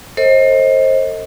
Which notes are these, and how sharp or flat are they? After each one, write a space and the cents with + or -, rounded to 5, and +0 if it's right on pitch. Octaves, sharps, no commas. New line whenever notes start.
A4 +40 C5 +30 D#5 +25